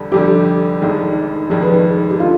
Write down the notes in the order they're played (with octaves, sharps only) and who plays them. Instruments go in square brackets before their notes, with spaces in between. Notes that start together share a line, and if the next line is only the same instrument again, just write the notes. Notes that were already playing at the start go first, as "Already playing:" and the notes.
Already playing: [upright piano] F1 F2 D3 G3
[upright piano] F1 F2 D3 G3 [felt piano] G4
[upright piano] F1 F2 D#3 G#3
[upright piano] F1 F2 D#3 G#3 [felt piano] G#4
[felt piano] B4
G#4
G4
[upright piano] D3 [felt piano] F4